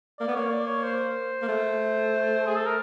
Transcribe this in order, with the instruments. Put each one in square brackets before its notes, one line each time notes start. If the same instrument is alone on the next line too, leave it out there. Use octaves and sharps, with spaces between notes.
[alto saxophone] A#3 [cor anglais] D5
[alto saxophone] B3
[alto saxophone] A#3 [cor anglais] C#5
[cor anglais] D5
C#5
C5
[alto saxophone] A#3
A3
[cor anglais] G#4
A4
A#4